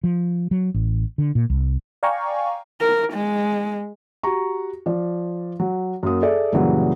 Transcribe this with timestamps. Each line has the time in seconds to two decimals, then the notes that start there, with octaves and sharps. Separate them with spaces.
0.04 F3
0.51 F#3
0.74 A1
1.18 D3
1.35 A#2
1.50 C2
2.03 D5 F5 G5 G#5 A#5 C#6
2.81 A#4
3.14 G#3
4.23 F#4 G4 A#5 C#6
4.86 F3 D5
5.60 F#3
6.03 F#2 A#3 D#6
6.22 G#4 A4 D5 E5
6.52 F#2 A#2 C#3 E3 F#3 G3